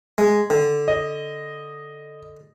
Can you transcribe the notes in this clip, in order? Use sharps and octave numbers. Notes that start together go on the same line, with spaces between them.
G#3
D3
D#5